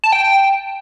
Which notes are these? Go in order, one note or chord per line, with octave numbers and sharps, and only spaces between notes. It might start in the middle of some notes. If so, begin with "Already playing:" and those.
A5
G5